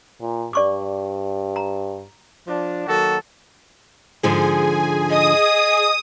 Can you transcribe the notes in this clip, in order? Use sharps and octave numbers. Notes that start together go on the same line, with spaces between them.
A#2
G2 D5 C#6 D6
A#5
F3 D4
D#3 F#3 A#3 F#4 A4
G#2 D3 F3 G#4 G#5
D#5 D#6